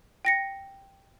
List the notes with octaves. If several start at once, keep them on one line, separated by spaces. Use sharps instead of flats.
G5 A#6 C#7